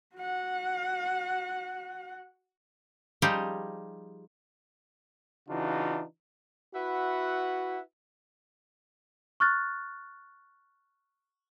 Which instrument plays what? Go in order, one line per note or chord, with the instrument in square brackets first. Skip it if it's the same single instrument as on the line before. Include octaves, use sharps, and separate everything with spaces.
[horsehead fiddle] F#4 F#5
[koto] F3 G3 D#4 G4 G#4
[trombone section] C#3 E3 D4 D#4 F4 F#4
[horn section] E4 F#4 B4 E5 F#5
[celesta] C#6 F6 F#6 A6